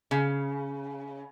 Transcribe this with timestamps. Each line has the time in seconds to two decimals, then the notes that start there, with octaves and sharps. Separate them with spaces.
0.11 C#3